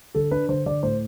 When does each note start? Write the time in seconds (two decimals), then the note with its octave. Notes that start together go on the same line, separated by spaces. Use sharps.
0.15 D3 A4
0.31 D4 B4
0.49 D3 C5
0.66 D3 D5
0.83 A2 C5